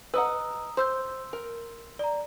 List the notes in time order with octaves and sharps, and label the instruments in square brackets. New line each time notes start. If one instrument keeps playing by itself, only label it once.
[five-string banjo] B4 D#5 F#5 [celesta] A#5 D#6 E6
[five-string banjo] C5 [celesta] C6 E6 G6
[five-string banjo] A#4
[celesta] D5 A#5